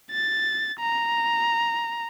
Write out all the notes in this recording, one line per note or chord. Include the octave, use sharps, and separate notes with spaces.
A6
A#5